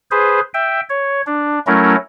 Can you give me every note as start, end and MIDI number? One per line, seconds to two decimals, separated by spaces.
0.11 0.40 68
0.11 0.40 71
0.11 0.40 72
0.54 0.80 76
0.54 0.80 79
0.90 1.22 73
1.26 1.59 62
1.67 1.96 54
1.67 1.96 57
1.67 1.96 61
1.67 1.96 64
1.67 1.96 70